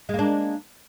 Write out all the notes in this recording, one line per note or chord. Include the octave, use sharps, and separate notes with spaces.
G#3 A#3 D4